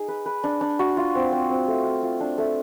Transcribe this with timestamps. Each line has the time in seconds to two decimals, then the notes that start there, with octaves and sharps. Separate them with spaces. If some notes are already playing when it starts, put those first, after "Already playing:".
Already playing: D#4 G#4
0.08 B4
0.26 B4
0.44 D4
0.61 D4
0.79 F#4
0.97 F4
1.15 C4
1.32 C4
1.50 C4
1.68 A3
1.85 F4
2.03 F4
2.20 D4
2.38 A3